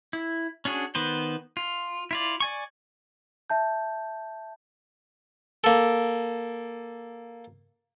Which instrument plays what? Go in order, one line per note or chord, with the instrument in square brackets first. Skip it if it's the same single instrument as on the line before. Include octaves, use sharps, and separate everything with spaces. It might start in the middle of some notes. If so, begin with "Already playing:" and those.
[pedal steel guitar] E4
C#4 D4 F#4 G#4
D#3 B3 B4 C5
F4
E4 F4 D5
D5 G#5 C#6
[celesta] E5 A5 G6
[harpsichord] A#3 A4